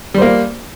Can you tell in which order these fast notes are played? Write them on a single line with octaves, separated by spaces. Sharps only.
G3 C5 A#3